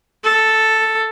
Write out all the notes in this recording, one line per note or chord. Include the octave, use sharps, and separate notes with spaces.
A4